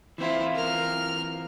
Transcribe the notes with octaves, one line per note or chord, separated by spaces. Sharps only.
E3 C4 E4 F4 C5
A#4 F6